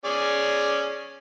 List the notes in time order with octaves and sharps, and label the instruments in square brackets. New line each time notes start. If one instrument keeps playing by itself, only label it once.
[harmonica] C#4 G#4 D5